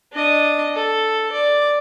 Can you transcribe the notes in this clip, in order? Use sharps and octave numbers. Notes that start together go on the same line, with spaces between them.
D4 D#5
A4
D5